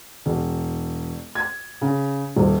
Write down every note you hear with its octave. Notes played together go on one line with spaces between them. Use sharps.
E1
G#6
C#3
D#1